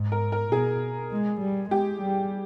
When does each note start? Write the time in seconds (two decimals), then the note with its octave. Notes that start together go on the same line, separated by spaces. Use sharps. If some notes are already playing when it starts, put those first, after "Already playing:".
Already playing: G#2
0.12 A#4
0.32 A#4
0.52 B2 G#4
1.11 G#3
1.40 G3
1.70 G#3 G4
2.01 G3